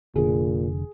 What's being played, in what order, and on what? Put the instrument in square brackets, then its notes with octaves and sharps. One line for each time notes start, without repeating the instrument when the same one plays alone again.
[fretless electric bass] F1 D3 [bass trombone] A#2 [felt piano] G#4